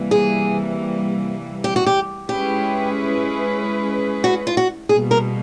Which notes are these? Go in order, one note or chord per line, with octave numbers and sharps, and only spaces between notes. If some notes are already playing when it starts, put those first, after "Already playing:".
Already playing: C3 E3 G3 A#3
G#4
G4
F#4
G4
G#3 C#4 E4 G4 G#4 B4
F#4
F4
F#4
B2 G3 A#3 G#4
A#4